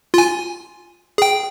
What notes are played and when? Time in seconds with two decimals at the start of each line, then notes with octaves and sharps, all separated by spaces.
0.14 F4 G#5
1.18 G#4 G5